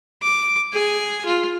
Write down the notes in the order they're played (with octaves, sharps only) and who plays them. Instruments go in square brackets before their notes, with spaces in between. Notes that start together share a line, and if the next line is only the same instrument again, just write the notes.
[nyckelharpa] D6
G#4 G#5
F4